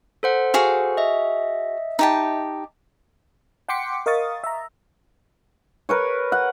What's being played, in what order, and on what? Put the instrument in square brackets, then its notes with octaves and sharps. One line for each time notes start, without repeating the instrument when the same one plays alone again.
[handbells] A4 C5 F#5
[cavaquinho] F#4 G#4 F5
[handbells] D#5 E5
[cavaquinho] D#4 G4 A5
[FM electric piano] F#5 G5 C6 D6 B6 C#7
A#4 D#5 F5 C#6 D#6 A6
E5 A#5
[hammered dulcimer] A#4 B4 C#5
F#5